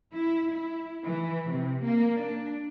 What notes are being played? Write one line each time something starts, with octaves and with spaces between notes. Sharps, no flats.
E4
E4
E3
C3
A#3
D4